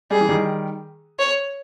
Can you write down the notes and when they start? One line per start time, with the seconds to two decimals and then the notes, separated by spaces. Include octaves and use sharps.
0.11 G3 G#4
0.21 E3
0.29 D#3 G3
1.19 C#5